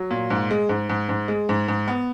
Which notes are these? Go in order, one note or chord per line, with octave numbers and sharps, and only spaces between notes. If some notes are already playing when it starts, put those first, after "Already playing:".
Already playing: F#3
A#2
G#2
G#3
G#2
G#2
G#2
G#3
G#2
G#2
B3